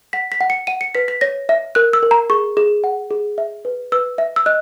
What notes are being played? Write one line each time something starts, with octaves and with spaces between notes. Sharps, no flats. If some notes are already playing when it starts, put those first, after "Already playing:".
F#5 B6
B6
F#5
C#7
F#5 D#7
C#7
B4 B6
B6
C#5 A#6
E5
A#4 F#6
E6
A#4
A#5
G#4 C#6
G#4
F#5
G#4
E5
B4
B4 E6
E5
E6
D#5 F#6